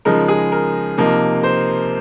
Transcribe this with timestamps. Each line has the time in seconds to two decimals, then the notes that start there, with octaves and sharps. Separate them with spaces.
0.05 C#3 F3 G#3 D#4 A#4
0.28 G#4
0.52 A#4
0.98 C3 F3 A#3 D#4
1.43 C5